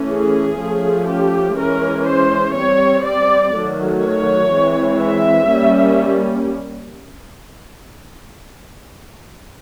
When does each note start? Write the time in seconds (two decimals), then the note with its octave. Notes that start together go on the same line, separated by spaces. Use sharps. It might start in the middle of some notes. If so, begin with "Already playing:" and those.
Already playing: E3 A3 C#4
0.08 G#4
0.58 F3 A3 C#4
1.07 G4
1.56 E3 G#3 C#4 A#4
2.05 C5
2.54 G3 C4 C#5
3.04 D5
3.53 D#3 F#3 A3
4.02 C#5
4.50 E3 G#3 C4
5.00 E5
5.49 G3 A#3 C#4